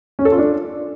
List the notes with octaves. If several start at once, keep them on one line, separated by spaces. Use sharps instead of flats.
C#4
A4
F4
D4